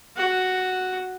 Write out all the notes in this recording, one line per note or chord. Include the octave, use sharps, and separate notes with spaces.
F#4